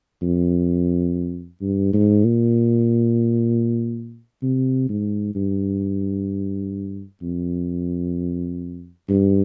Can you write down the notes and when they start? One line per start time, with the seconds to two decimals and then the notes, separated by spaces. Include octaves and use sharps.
0.22 F2
1.61 G2
1.93 G#2
2.24 A#2
4.42 C3
4.89 G#2
5.35 G2
7.22 F2
9.09 G2